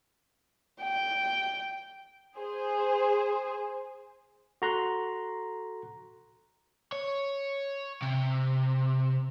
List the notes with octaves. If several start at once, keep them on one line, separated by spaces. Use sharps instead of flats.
G5
G#4 C5
F#4 A4 A#5 C6 C#6 F#6
C#5
C3